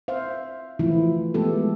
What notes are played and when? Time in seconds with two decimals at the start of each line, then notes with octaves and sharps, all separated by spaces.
0.08 C5 E5 F5
0.79 E3 F3 A3 E4 F4
1.34 G#3 A3 B3 G4 A4